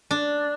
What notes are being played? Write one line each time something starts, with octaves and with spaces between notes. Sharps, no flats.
D4